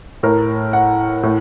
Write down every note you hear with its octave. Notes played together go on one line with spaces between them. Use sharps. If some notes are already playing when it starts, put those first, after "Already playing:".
A2 A#4
F#5
A2